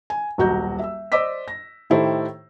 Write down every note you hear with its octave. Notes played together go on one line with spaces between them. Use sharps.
G#5
D#1 B1 F#4 A#5 G6
E5 E6
C5 D5 D#5 D6 E6 B6
A#6
A2 D#3 E4 G4 A4 C5